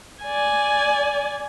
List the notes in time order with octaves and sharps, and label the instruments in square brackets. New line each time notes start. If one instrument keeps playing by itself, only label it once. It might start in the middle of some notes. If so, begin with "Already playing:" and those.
[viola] D5 G#5